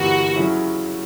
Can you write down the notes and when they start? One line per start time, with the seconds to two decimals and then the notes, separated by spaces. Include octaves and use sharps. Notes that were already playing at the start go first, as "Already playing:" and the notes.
Already playing: G1 G2 E3 G3 A#3 F#4
0.35 C#3 F#3 C#4 E4